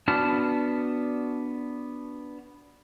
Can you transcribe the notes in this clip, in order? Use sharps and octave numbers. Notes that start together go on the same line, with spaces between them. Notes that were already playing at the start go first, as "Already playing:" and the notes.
B3 D4 F#4 A5 F6